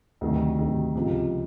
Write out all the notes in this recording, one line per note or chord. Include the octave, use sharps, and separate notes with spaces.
D2 C3 D#3 F#3
D2 C3 D#3 F#3
C#2 C3 F3